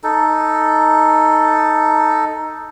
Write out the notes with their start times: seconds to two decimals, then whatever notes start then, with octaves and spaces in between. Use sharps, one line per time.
0.03 D#4 A4